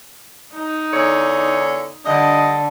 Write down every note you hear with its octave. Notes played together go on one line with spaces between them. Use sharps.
D#4
E2 D3 C#5
G2 D3 D#5